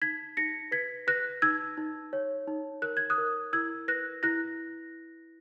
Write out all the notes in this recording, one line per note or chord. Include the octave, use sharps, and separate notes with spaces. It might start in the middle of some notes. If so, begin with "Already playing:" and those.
D#4 G#6 B6
D#4 A#6 C#7
B4 G#6 B6
B4 F#6 A#6
D#4 E6 G#6
D#4
C#5
D#4
A#4 F#6
G#6
D#6 F#6
A#4
E4 E6 G#6
B4 F#6 A#6
E4 F#6 A#6